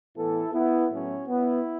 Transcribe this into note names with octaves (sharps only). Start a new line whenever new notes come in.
A2 E3 B3 E4 A4
B3 E4
A2 F#3 A3 C#4
B3 E4